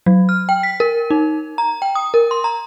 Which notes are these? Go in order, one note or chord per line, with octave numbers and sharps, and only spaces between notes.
F#3
F6
G5
B6
A#4
D#4
A#5
G5
D#6
A#4
C6
A#5